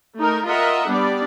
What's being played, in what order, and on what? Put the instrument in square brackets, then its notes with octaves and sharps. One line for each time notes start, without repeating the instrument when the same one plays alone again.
[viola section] A3 D#4 A#4
F4 A#4 D#5 E5 F#5
G3 B3 D4 D5